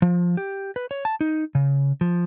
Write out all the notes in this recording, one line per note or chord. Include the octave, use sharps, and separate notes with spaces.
F3
G4
B4
C#5
A5
D#4
C#3
F3